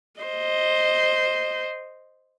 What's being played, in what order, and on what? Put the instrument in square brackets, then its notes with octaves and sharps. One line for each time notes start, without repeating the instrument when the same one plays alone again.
[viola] C5 D#5